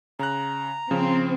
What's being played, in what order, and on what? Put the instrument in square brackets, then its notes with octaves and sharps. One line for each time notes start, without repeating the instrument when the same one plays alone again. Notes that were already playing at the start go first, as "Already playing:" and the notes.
[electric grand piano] C#3 F#6 [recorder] A#5
[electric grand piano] C#3 F3 [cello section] C4